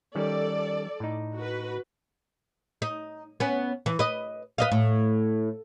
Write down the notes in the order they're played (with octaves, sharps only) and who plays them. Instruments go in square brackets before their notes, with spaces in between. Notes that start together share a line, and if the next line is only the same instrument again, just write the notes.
[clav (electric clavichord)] D#3 G3 C#4 [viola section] A4 D5
[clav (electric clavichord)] A2 D#4
[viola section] F#4 B4
[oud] D#4
B3 C#4
E3
B4 D#5
B4 D#5 F5
A2